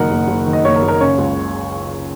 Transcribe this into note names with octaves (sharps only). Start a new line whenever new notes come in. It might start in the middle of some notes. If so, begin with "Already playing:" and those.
Already playing: F#1 F#2 D#3 A#4 D#5 F#5
F#1
F#1
D#3
D#5
F#1 C#5
A#4
F#1
A#4
C#3 C#5
C#2